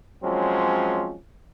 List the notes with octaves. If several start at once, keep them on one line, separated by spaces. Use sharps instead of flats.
F3 F#3 G#3 C4 C#4